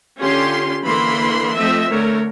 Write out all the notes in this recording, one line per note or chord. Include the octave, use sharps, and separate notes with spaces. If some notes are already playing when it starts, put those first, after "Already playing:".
D3 C#4 F4 G4 C6
D3 E3 A#3 B5 C6
F3 A3 C4 A4 D#5 E5
D3 A3 A#4 C#5